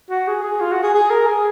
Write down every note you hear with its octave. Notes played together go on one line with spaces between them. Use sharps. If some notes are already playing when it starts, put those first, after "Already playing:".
F#4
G#4
G#4
F4
F#4
G#4
G#4
A#4
G#4